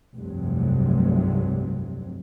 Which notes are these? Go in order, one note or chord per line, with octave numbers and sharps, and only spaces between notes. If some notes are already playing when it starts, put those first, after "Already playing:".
F1 C2 G2 C3 F#3